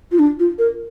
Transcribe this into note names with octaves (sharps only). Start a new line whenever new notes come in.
F4
D4
F4
A#4